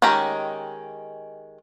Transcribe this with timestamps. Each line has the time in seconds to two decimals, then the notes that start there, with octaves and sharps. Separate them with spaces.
0.02 D#3 G#3 C#4 G4 A#5